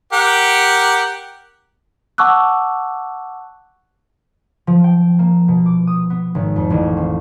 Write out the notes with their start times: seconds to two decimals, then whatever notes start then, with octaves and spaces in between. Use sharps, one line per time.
0.13 G4 A#4 F#5
2.18 F#5 A5 C#6 D6 E6 F#6
4.67 F3
4.84 G5
5.19 A#3
5.48 B2
5.66 D6
5.87 D#6
6.10 B3
6.35 G#1
6.56 F2
6.70 A1
6.97 C4